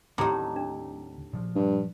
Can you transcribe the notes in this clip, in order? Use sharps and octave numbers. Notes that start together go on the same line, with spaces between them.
D#2 A2 D3 C4 D#4 G4 A#5 D6
D4
A#2 F3
G2